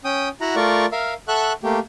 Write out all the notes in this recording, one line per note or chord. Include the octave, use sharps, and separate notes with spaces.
C#4 G5 D#6
E4 F#4 F#5 A#5
A3 F4 A#4 D5 C#6
A#4 E5 F5
A4 E5 F#5 C#6 F#6
A3 A#3 G4